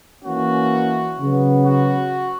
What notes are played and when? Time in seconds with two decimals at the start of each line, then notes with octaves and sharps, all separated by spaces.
0.23 E3 A#3 C#4 F#4
1.19 C#3 F#3 B3
1.66 F#4